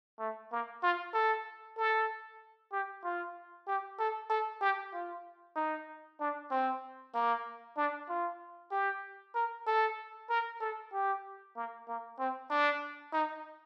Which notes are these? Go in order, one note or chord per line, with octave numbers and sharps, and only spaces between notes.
A3
A#3
F4
A4
A4
G4
F4
G4
A4
A4
G4
F4
D#4
D4
C4
A#3
D4
F4
G4
A#4
A4
A#4
A4
G4
A#3
A#3
C4
D4
D#4